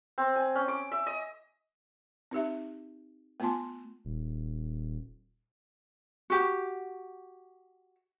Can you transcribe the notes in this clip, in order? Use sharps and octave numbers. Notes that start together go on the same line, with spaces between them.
C4
G#5
C#4
D6
E5
D#5
C4 D#4 G4 E5
A3 B3 F4 G#5 A5 C6
D#1
F#4 G4